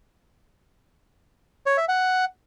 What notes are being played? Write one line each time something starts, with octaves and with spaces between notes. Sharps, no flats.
C#5
E5
F#5